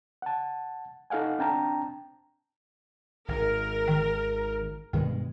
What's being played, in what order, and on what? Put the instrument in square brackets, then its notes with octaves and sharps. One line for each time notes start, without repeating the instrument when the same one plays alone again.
[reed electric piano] F#5 A5
D#4 A4 F5 F#5 G#5
C4 D4 G5 A5 A#5
[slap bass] G#1 G#2 [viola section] A#4
[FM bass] D#3
[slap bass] G2 B2 G#3 [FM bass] D#3